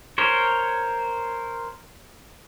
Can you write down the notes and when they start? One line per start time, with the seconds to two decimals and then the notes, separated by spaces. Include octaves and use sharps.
0.18 A#4 C5 C#5